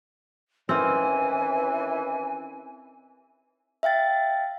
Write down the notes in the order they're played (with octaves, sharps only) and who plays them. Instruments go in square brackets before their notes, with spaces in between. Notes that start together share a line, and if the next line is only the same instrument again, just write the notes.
[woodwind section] D#2 E3 [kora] C4 C#4 [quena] G#5
[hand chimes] E5 F5 G5 A6